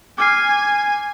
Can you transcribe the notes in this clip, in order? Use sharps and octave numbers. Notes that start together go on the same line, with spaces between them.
G#5 D6 F6 C7